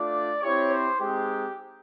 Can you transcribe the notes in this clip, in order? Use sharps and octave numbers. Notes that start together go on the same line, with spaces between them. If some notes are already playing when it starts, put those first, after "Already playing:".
Already playing: A3 D4 F4 D5
C4 E4 G4 C#5
C5
G#3 C4 D#4 G4